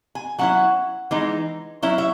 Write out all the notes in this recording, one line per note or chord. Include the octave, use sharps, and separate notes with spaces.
G#5
F#3 C#4 E4 F#5
E3 G#3 D#4
F#3 C#4 E4 E5
E5